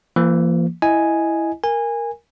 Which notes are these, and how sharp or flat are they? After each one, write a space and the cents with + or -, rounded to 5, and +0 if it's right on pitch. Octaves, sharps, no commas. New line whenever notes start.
F3 -45 A#3 +0
E4 +0 D#5 +5 G#5 +0
A#4 +0 G#5 -20